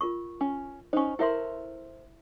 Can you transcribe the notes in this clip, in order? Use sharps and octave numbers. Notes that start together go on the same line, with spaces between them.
F4 A#4 C#6
C#4
C#4 D#4 C5 C#6
E4 A4 A#4 C5 E5 C6